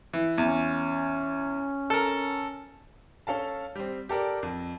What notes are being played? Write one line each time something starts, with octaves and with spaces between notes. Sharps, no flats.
E3
E2 C#4
A4 A#4
C#4 A4 F5 A5
G3 C4
G4 A4 A#4 D5
F2